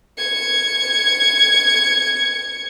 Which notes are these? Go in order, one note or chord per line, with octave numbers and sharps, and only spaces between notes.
G#6 C#7